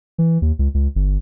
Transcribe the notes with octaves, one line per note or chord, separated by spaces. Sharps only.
E3
D#2
C#2
C#2
G1